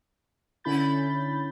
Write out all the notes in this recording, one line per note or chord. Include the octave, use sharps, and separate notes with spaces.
D3 C#4 E4 B5 G6 A6